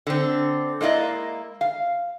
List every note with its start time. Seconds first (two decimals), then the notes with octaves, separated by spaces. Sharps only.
0.07 D3 C4
0.81 G#3 A#3 E4 D5 D#5
1.61 F5